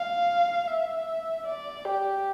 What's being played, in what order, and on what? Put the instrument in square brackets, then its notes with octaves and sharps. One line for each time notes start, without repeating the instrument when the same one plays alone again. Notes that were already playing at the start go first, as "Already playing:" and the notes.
Already playing: [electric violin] F5
E5
D5
G4